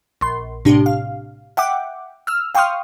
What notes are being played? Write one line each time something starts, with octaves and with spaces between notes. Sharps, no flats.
A#1 C6
A2 C3 D4 G4
F5
E5 F#5 G5 D6
E6 F6
F5 G5 C6 C#6 D#6 F6